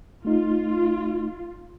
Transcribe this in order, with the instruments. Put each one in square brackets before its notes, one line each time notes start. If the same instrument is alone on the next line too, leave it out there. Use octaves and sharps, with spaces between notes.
[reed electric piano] A3 D#4 [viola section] F4